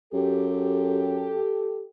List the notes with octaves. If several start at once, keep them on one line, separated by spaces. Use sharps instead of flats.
F#2 G4 A4